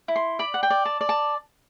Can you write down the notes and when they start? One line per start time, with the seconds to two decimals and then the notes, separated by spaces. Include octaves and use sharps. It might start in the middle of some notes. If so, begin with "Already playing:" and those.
0.08 E4
0.16 C6
0.39 D5 B5
0.54 F#5
0.63 G5
0.70 D5
0.85 A5
1.01 D5
1.09 A5